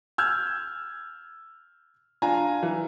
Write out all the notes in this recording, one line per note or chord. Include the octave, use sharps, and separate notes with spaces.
E6 F6 G6 G#6
D4 F4 G#5 A#5
E3